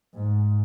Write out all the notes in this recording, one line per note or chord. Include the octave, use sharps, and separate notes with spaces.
G#2